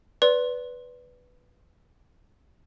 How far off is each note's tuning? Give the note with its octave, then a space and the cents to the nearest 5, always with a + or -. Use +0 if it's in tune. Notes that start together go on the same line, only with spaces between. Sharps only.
B4 +0 D5 -20 C6 +10